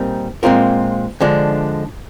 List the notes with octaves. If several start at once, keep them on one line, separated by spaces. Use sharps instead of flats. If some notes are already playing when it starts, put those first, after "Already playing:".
Already playing: A#2 G3 C4 D#4 A#4
A#2 G#3 C4 F4 A#4
D3 F3 G#3 D4